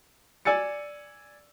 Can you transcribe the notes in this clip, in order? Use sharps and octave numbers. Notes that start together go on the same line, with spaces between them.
D5 G#5 E6 A6 C#7